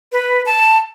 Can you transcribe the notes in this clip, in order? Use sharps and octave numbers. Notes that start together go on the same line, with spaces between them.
B4
A5